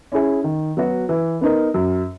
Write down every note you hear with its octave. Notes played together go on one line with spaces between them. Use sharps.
C#4 E4 G#4
D#3
F#3 B3 F#4
E3
B3 D#4 A#4
F#2